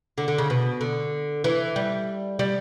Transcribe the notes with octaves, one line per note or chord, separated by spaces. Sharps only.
D3
D3
C#3
B2
D3
E3
G3
G3